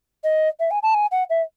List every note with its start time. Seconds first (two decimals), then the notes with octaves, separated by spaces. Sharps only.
0.24 D#5
0.60 E5
0.71 G#5
0.83 A5
0.94 G#5
1.12 F#5
1.30 E5